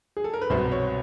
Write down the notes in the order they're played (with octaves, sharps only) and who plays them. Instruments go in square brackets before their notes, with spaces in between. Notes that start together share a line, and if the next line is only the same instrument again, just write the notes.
[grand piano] G#4
A4
A#4
B4
C2 B2 F#3 B3 C5
C#5